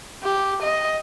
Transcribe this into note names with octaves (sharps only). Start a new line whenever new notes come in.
G4
D#5